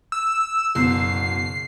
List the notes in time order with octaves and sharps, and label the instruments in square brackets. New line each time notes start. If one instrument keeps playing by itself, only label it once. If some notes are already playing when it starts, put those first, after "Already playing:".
[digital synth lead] E6
[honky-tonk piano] F#1 B2 [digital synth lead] C7